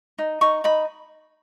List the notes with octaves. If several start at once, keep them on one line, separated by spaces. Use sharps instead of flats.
D#4
D#4 C#6
D#4 B5